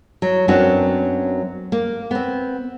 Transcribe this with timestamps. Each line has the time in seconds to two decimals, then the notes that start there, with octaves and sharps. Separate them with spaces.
0.22 F#3
0.48 F#2 F#3 B3 C4 D4 F#4
1.72 A#3
2.11 B3 C4